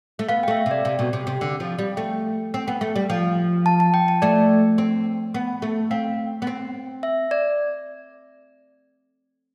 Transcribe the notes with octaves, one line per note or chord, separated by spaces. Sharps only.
A3
B3 F5
G5
A3 E5
F5
C3
D5
C3
B2
C3
C3
D3
F3
G3
A3 G5
C4
B3
A3
G3
F3
A5
A5
G5
A5
A3 D5
C4
B3
A3
C4 F5
B3
C4
E5
D5